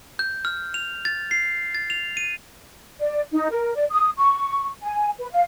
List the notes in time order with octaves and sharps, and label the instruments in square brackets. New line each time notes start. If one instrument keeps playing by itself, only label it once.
[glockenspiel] G6
F6
F7
A6
C7
A6
F7
D#7
[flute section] D5
D#4
A#4
D5
D#6
C#6
G#5
B4
F5